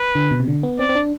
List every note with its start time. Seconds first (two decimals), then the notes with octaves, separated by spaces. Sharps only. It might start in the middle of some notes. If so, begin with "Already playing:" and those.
Already playing: B4
0.15 D3
0.31 B2
0.40 C3
0.47 D3
0.63 B3
0.79 C4 D5
0.89 C4
0.95 D4